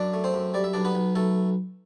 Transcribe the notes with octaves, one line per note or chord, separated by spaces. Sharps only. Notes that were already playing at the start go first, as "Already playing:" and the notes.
Already playing: F#2 D4 D5
A3
C4 C5
F#2
G3 D5
E5
B1 D4 D5
B3 B4
B1
B1 A3 A4